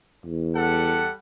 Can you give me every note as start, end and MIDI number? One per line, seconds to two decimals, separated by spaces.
0.25 1.08 40
0.56 1.13 55
0.56 1.13 69
0.56 1.13 78